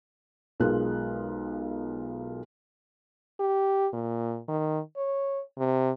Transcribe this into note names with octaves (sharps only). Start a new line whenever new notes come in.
B1 G#3 F4 A#4 F#6
G4
A#2
D#3
C#5
C3